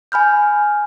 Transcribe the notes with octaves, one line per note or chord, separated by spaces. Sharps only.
G#5 B5 F6 G6